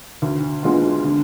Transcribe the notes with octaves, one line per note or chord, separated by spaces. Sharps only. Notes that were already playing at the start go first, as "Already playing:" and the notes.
D2
D3 G#3 B3 F4
D3